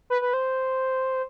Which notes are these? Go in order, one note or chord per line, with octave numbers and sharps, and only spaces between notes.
B4
B4
C5